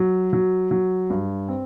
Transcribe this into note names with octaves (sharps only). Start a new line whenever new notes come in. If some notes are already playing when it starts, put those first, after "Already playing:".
Already playing: F#3
F#3
F#3
G2
C4